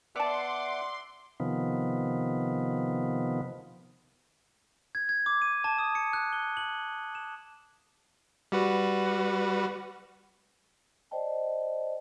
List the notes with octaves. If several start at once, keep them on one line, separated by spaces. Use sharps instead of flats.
B3 D5 E5 F#5 A5 C6 D6
C3 D#3 F3 B3
G#6
G#6
D6
D#7
A5
D#6
C#7
F#6
G7
F#7
E7
G3 F#4 B4
C5 D5 D#5 G5 A5